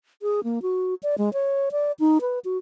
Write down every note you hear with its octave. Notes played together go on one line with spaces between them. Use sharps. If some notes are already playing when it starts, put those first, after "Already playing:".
G#4
A#3
F#4
D5
G#3
C#5
D5
D#4
B4
F#4